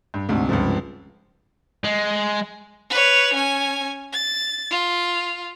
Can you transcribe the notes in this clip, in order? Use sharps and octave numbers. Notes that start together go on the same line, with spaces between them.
G2
D2 G#2 C3
C#2 G2 C3 F3
G#3
B4 C#5
C#4 G#5
A6
F4